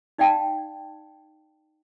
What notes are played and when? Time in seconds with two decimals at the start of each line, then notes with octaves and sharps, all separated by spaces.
0.18 D#4 D5 F5 G5 A5